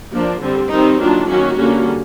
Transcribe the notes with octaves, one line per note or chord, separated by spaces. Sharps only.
F3 A#3 D4
D3 G3 C4
D#3 G3 C4 D#4
D#3 F#3 A#3 D4 F4
D#3 F#3 A#3 C#4 F#4
D3 G3 A#3 C#4